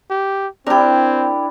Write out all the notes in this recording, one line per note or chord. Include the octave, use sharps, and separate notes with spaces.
G4
C4 D4 E4 G4 A#4